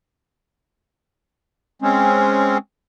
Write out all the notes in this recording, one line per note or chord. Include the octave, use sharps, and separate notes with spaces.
G#3 C4 C#4